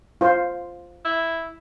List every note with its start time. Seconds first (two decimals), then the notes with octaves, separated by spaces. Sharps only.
0.21 F4 C5
1.05 E4